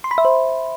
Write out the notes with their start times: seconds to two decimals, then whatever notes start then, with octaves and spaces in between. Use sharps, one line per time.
0.04 C6
0.11 B5
0.18 E5
0.25 C5